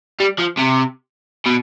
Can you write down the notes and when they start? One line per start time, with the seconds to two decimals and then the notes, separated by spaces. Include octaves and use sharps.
0.20 G3
0.39 F3
0.59 C3
1.46 B2